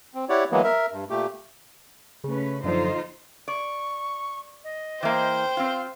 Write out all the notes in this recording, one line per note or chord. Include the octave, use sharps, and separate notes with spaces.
C4
E4 G4 C#5 D5 F#5
E3 F#3 G#3 A#3 B3
A#4 E5
G2
A#2 A3 G4
C#3 A3 C#4 B4
F#2 D3 F3 D#4 F4 C5
D5 C#6
D#5
E3 A#3 C5 G5
C4 F4 F5